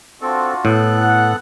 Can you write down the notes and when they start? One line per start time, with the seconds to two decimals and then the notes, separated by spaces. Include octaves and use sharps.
0.22 C4 D4 F4 F#4 A4
0.65 A2 B3 A4 F#6
0.98 F#5